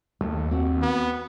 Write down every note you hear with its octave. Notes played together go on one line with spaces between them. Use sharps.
D#2 A3
C4 F#4
B3